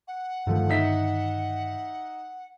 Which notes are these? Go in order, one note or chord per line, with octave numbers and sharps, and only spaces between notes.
F#5
G2 D3 D#3 F3 A3
D#4 E5 B6